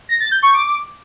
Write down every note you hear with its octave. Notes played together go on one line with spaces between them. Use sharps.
A#6
A6
G6
C#6
D6